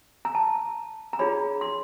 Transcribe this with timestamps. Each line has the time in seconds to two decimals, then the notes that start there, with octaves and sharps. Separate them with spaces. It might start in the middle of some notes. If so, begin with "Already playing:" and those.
0.25 A#5
0.35 A5
1.13 A#5
1.19 D4 F4 G#4 C#5 B5
1.61 C6